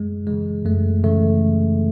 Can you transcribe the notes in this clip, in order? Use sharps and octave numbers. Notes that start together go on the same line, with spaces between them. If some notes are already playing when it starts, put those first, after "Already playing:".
Already playing: F#2 G#3
C#3 E3 G#3
F#2 A3
C#3 E3 A3